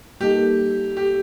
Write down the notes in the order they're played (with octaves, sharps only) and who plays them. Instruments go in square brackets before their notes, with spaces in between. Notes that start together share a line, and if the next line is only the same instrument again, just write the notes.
[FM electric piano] G3 A#3 D#4 A4 [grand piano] G4
[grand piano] G4